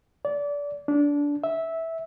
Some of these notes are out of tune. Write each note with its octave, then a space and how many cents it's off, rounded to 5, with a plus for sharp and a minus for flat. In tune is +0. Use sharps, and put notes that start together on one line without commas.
D5 -25
D4 -20
E5 -10